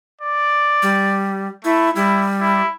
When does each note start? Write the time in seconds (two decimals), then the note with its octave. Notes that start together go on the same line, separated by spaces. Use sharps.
0.21 D5
0.82 G3
1.64 A3 E4
1.96 G3 E4
2.41 E4